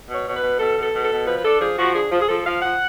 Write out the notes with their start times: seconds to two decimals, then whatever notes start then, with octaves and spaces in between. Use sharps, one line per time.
0.09 B2
0.15 C#5
0.26 B2 C#5
0.37 B4
0.42 B2
0.59 B2 A4
0.77 B2 A4
0.94 B2
1.05 A4
1.11 B2
1.27 F3 B4
1.38 B4
1.45 D4 A4
1.61 F3 G#4
1.79 F3 F#4
1.95 D4 G#4
2.12 F3
2.21 G#4
2.29 F3 A4
2.46 F3 F5
2.62 F3 F#5